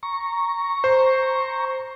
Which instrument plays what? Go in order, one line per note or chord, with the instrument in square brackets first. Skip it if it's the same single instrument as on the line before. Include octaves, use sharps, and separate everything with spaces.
[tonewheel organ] A#5 C#6
[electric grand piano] C5